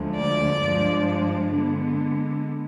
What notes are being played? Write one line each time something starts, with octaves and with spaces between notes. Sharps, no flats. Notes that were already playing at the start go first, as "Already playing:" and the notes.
Already playing: D2 D3 F3 G#3
D5
G2 F3 G#3 D4
D3 G#3 B3